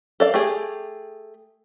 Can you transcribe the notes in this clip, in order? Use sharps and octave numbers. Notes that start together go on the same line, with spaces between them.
A4 D5 F5
A3 G4 G#4